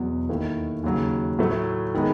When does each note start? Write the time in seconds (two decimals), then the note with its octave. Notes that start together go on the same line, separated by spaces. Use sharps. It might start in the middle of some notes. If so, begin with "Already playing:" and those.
Already playing: E2 B2 F#3
0.29 D#2 D#3 A3 E4
0.84 D#2 C#3 F#3
1.39 A2 F#3 A3
1.94 D#3 G#3 B3